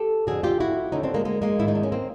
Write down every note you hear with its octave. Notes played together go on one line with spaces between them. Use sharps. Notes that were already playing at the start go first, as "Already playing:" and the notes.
Already playing: G4 A4
F2 D3 F#4 G#4
F4 G4
E4 F#4
D#2 D3 C#4 D#4
C4 D4
G#3 A#3
G#3 A#3
G#3 A#3
G#2 D#3 E4
D#4
D4
C#4
A#3 C4